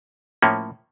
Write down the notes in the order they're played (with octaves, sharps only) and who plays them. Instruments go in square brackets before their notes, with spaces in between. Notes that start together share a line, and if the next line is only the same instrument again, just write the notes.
[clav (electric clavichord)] A2 F3 A#3 C#4